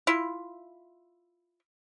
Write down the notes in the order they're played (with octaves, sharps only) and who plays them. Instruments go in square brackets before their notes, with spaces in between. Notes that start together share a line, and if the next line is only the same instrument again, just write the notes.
[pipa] E4 F4